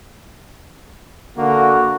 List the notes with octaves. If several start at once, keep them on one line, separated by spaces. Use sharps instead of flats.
D3 A#3 F#4